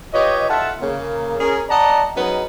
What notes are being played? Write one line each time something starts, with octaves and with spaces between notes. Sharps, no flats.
F4 G4 B4 C#5 D#5
D#4 F4 A4 E5 F#5 A5
C#3 A#3
C#4 G#4 A#4
D5 D#5 F#5 A5 A#5
F#3 B3 C#4 D#4 G#4 D#5